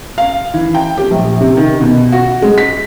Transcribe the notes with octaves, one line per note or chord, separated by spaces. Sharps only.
F5
E3
G5
G4
A#1
C3
D#3
B2
F#4
G#3
B6